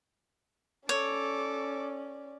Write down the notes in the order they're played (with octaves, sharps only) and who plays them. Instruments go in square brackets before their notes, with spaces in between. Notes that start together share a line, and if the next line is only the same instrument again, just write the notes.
[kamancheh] C#4 D5 [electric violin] A4 D6 [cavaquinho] C#5